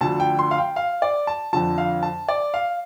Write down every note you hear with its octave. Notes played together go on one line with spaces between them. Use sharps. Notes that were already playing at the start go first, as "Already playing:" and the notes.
D2 D3 F3 A5
G5
C6
F5
G5
F5
D5
A5
F2 D3 F3 A5
F5
A5
D5
F5